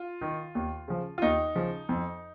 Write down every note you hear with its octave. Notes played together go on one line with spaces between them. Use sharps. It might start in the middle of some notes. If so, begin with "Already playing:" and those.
Already playing: F4
D#3
D#2
C#3 F3
F4
D#2 D#4
C#3 F3
F2